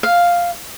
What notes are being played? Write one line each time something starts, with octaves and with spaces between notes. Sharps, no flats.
F5